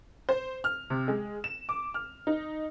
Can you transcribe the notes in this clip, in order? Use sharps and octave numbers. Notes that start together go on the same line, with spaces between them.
C5
F6
C3
G#3
E7
D6
F6
D#4